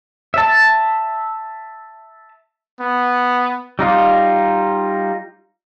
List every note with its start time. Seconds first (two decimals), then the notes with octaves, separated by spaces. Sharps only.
0.34 E5 A5
2.80 B3
3.79 G3 D#4 F4